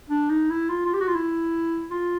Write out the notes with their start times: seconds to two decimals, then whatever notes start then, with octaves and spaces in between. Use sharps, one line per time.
0.09 D4
0.30 D#4
0.50 E4
0.70 F4
0.85 F4
0.93 G4
1.00 F#4
1.07 F4
1.15 E4
1.91 F4